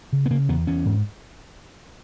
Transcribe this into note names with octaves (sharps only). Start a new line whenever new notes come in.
C#3
B3
C#3 A#3
E2 B3
E2 C#4
G#2